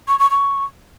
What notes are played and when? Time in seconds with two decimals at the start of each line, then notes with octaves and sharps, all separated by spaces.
0.08 C#6
0.19 C#6
0.31 C#6